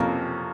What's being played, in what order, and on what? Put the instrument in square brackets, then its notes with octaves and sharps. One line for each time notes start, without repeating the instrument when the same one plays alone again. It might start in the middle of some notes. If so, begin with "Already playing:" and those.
Already playing: [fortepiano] F2 C3 F3 A#3 C#4